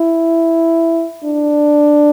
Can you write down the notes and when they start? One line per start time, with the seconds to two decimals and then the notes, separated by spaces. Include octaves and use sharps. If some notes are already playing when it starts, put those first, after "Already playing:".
Already playing: E4
1.24 D4